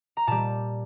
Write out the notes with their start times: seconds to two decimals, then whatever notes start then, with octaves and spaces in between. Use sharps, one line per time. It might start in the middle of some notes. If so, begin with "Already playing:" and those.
0.17 A#5
0.27 A#2 G3 A5